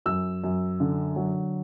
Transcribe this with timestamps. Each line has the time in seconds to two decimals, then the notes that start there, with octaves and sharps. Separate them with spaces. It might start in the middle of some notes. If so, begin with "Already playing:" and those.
0.06 F#2 E6
0.44 F#2
0.80 D3
1.16 F#3